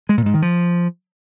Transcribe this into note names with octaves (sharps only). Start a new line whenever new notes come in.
G#3
A#2
G#2
D#3
F3